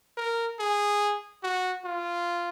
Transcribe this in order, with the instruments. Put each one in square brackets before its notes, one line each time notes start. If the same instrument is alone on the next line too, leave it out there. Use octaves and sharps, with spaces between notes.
[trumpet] A#4
G#4
F#4
F4